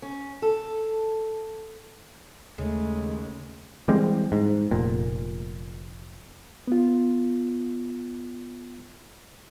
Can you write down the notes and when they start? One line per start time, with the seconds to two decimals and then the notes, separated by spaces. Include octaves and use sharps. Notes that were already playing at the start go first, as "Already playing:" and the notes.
0.02 C#4
0.42 A4
2.58 D#2 C#3 G#3 A3
3.88 E3 G3 G#3 C4
4.32 G#2
4.71 F1 A#2
6.67 B3 F4